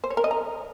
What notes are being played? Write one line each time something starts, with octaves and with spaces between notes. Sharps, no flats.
C5
C#5
A#4
D#5
A#5